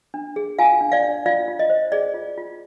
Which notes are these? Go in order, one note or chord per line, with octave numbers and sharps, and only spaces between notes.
D4
G#4
F4 F5 G#5
D4
D5 F5
D4
F4 D5 F5
F4
D#5
C5
G#4 D5
F4
F4